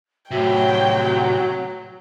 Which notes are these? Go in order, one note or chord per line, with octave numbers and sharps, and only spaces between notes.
A2 C3 F#3 F#4 G5